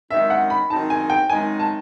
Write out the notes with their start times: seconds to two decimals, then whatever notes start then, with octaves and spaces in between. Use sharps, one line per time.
0.10 F#2 D#3 G#3 C4 D#4 E5
0.30 F#5
0.50 B5
0.70 F#2 D#3 G#3 C4 D#4 A5
0.90 G#5
1.10 G5
1.30 F#2 D#3 G#3 C4 D#4 G#5
1.59 A5